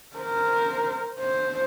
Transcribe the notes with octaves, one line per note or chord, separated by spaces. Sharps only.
A#4 C5
C5